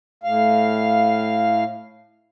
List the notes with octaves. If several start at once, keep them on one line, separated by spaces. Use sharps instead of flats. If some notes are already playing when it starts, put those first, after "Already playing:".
A2 F5